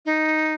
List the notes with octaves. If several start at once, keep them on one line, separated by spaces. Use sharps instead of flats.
D#4